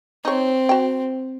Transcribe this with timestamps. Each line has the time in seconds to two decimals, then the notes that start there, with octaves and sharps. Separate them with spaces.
0.25 C4 D#4 C#5
0.69 F#4 G5